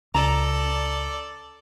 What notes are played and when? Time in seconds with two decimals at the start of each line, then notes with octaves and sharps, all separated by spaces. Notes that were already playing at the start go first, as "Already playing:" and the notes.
0.14 C#2 A4 D5 A#5